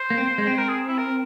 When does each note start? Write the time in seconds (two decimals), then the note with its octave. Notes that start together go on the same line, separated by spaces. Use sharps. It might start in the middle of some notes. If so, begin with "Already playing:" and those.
Already playing: C5
0.10 A#3
0.18 C4
0.38 G#3
0.47 C4
0.58 A#4
0.69 G#4
0.88 E4
0.98 A#4